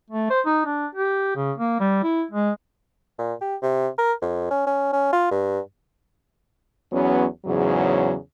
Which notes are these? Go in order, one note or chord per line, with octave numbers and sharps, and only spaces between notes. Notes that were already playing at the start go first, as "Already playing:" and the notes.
A3
C5
D#4
D4
G4
C#3
A#3
G3
E4
G#3
A#2
G4
C3
A#4
F2
C#4
C#4
C#4
F4
G2
E2 F#3 B3 C#4
E2 G#2 C#3 F#3